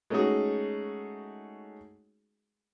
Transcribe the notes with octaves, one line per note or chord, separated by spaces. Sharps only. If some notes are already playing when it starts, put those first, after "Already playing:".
G#3 A3 C#4 D#4 F#4 G#4